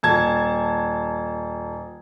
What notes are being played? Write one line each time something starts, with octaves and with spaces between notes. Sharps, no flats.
D#1 A5 G#6